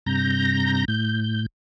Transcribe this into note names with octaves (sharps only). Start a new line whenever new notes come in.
G2 C3 A#5 G6 A#6
A2 G6